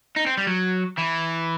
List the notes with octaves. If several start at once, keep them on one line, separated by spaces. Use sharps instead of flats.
D#4
C4
G3
F#3
E3